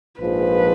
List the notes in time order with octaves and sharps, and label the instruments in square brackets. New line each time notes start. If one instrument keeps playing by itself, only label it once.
[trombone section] A#1 G#2 F3 [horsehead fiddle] B4